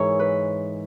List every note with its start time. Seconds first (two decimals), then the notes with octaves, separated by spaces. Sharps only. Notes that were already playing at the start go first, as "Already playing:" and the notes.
Already playing: G#2 E3 G#4 A#4 C#5
0.19 B4